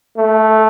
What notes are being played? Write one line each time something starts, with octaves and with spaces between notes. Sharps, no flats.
A3